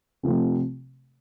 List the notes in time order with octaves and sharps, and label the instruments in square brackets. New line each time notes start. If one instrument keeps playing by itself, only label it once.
[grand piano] C3 F3 A3 C4